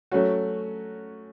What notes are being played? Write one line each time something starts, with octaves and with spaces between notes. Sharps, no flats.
F#3 A3 C#4 F#4